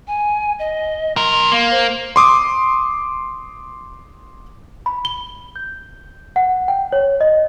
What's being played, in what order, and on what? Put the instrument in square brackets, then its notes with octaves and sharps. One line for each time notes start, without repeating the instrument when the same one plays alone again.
[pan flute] G#5
D#5
[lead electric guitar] B1 A#4 [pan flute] C6
[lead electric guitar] A#3
[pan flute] C5
[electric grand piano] C6 D6 D#6
[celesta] B5
G7
G6
F#5
G5
C#5
D#5